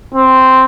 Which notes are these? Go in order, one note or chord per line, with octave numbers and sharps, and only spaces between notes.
C4